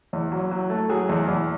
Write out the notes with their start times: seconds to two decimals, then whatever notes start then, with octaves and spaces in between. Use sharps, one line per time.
0.13 E2
0.32 F#3
0.51 F#3
0.70 A3
0.90 F#3 G#4
1.09 E2
1.28 E2